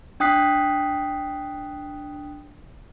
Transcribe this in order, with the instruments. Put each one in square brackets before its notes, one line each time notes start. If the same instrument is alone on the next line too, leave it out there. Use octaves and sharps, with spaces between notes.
[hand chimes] D4 G5 D#6 F#6 B6 C7